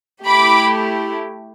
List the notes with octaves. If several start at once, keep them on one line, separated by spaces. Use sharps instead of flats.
A3 E4 G4 B5 D6